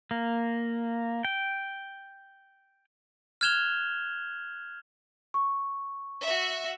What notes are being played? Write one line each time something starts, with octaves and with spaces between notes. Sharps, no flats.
A#3
G5
F6 F#6 G#6 E7 F7 G7
C#6
F#4 E5